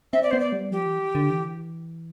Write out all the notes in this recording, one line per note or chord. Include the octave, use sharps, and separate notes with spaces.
C4 E5
D5
B3 C5
D5
G3
F3 G4
E3
D3
E3